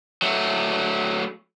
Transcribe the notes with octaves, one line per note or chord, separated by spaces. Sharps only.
F#3 A3